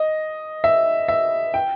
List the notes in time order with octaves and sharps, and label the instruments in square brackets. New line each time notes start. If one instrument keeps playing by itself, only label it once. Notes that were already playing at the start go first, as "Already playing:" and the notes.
Already playing: [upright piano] D#5
E5
E5
G5